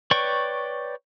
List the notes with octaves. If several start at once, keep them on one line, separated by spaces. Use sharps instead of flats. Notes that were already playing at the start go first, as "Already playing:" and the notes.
B4 C#5 D5 G5 C#6